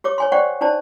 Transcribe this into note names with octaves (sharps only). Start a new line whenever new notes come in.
G4 C#5 D6
C#5 G#5 C6
C5 D5 F#5 G5 C#6
D4 D#4 C5 D5 A5